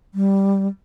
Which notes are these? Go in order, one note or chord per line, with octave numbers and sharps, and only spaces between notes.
G3